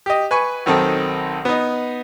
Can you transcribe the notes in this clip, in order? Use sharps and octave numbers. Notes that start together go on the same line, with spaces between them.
G4 D#5
B4 G#5 C#6
B1 D#3 C4 A4
B3 D#4